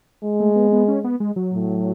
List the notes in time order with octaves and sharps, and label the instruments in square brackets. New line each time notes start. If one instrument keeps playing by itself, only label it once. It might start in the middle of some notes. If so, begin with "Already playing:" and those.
[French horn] G#3
[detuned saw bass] A3
B3
B3
C#4
B3
G#3
F#3
[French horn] A2